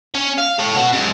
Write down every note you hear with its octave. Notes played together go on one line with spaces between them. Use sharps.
C#4
F5
A4 C#5
B3 F#4
F#2 G#3